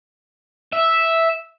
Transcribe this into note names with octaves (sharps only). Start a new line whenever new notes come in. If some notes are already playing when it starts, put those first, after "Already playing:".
E5